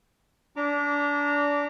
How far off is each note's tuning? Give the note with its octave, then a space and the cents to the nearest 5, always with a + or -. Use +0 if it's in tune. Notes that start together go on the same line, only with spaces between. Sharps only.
D4 -25 A#5 -25 D6 -15